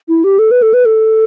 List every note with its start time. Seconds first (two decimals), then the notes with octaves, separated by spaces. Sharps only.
0.08 E4
0.24 G4
0.39 A4
0.51 B4
0.62 A4
0.74 B4
0.85 A4